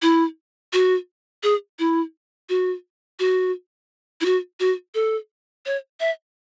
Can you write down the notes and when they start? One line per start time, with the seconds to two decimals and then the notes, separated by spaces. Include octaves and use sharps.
0.02 E4
0.73 F#4
1.43 G#4
1.79 E4
2.49 F#4
3.20 F#4
4.21 E4
4.25 F#4
4.60 F#4
4.95 A4
5.66 C#5
6.00 E5